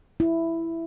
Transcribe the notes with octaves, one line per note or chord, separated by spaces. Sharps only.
E4